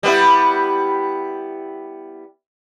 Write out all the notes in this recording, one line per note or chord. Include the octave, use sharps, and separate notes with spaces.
G3 B3 E4